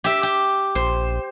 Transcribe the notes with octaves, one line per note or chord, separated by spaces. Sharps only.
G4 E5
G4
A#1 C5